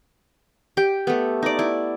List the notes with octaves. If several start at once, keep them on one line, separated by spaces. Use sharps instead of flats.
G4 G5
A3 B3
D#4 D5
E4